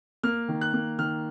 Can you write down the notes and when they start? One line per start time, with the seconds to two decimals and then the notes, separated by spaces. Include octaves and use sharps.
0.23 A#3 F6
0.49 D#3
0.61 F#6
0.73 A#3
0.99 D#3 F6